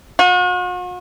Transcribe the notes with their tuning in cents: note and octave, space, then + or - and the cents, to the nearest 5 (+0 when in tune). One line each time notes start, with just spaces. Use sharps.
F#4 -45